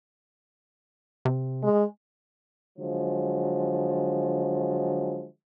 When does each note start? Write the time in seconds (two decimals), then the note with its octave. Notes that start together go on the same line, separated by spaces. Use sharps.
1.25 C3
1.63 G#3
2.79 D3 F3 F#3 G#3